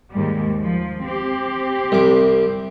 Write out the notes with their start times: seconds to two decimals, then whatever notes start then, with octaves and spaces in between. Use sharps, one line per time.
0.11 D#2 G#2 G3
0.62 F3
1.03 C4 G4
1.92 C2 D6